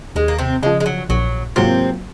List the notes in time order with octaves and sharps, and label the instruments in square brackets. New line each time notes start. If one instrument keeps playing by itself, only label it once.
[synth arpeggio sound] D#2 [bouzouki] G#3
[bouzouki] A#3
C3 C4
[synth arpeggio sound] C#3 F3 [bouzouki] G#3
[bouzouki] G#3
F#3
[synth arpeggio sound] A#1 [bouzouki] F#3
[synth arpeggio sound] G#2 F#3 A#3 F4 [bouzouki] C3 C4